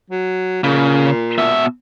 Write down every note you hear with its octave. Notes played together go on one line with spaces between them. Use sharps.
F#3
A#2 C#3
B2 E5